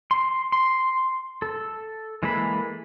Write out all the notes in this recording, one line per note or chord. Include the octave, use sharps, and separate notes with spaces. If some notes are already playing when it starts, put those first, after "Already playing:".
C6
C6
A4
E3 G#3 A#3 A4 B5